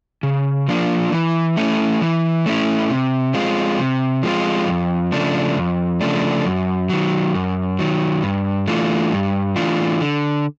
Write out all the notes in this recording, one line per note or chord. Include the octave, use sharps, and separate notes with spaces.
C#3
F3 A#3 D4 F4
E3
A3 C#4 E4
E3
A3 C#4 E4
C3
F3 G#3 C4 F4
C3
F3 G#3 C4 F4
F2
C#3 F3 A3 D4
F2
C#3 F3 A3 D4
F#2
D#3 F#3
F#2
D#3 F#3
G2
E3 A3 D4 F4
G2
E3 A3 D4 F4
D3